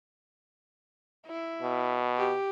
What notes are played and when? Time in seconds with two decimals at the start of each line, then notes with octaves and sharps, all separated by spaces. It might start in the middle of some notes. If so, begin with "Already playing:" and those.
1.27 E4
1.62 B2
2.18 G4